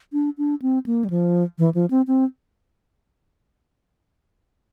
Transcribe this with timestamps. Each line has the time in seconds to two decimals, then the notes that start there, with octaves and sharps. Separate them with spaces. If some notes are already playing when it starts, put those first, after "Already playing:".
0.13 D4
0.38 D4
0.62 C4
0.86 A#3
1.05 G3
1.10 F3
1.59 E3
1.74 F3
1.90 C4
2.07 C4